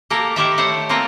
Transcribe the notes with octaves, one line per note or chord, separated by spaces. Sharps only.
A#3 G4 A4 A#4
D#3 E4 G4 A4 C5 E5
A3 C5 C#5 F#5
A#3 C4 F4 A4 A#4